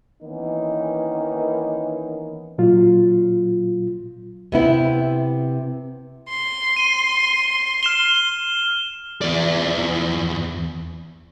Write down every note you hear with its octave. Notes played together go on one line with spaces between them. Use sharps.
D#3 E3 A#3 B3 C#4 D#4
A#2 F#3 F4
C3 B3 E4
C6
D#7
F6 E7 G7
E2 D5